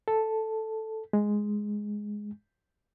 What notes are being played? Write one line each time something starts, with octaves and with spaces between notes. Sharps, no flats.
A4
G#3